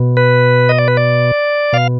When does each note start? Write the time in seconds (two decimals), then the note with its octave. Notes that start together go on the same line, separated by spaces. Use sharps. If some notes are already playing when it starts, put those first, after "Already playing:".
Already playing: B2
0.17 B4
0.69 D#5
0.78 D5
0.88 B4
0.97 D5
1.73 B2 F5